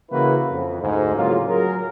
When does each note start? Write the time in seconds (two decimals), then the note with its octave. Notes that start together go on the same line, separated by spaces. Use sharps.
0.11 C#3 E3 A#3 E4 F#4 B4
0.50 F2
0.82 D2 G#2
1.15 A2 C#3 F#3 A#3 F4
1.47 F#3 G#4 A#4